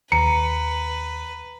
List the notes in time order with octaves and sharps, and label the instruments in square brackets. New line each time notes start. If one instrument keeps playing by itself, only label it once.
[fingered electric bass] D#2 [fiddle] B4 [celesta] A#5 [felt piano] C#7